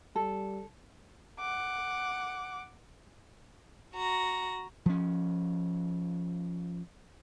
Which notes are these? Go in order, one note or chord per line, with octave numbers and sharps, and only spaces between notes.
G3 A4
F#5 D6
F#4 A#5
F3 C#4